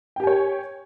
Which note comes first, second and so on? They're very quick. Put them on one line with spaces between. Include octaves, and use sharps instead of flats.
G5 G4 G#5 C#5